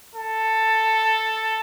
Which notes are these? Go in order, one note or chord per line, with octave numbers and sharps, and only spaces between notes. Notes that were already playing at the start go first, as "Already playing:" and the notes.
A4